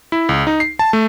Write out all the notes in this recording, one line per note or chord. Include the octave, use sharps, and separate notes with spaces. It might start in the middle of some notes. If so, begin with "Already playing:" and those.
E4
C#2
D#4
C7
A5
A3